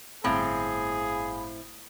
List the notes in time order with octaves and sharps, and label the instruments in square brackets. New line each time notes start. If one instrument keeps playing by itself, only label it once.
[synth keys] G1 F5 B5 [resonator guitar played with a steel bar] A2 C4 [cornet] G#4